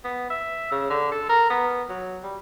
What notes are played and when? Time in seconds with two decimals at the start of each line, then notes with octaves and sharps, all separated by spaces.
0.04 B3
0.30 E5
0.71 C#3
0.90 D3
1.12 A4
1.29 A#4
1.50 B3
1.89 F#3
2.23 G3